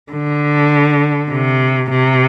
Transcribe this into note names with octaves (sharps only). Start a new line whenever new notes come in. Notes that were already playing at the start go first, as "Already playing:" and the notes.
D3
C3
C3